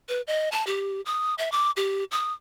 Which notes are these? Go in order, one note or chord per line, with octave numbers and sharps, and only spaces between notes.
B4
D#5
A5
G4
D#6
E5
D6
G4
D#6